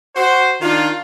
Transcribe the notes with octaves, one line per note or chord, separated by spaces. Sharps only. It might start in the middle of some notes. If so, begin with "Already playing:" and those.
F#4 C5
D#3 D4 F4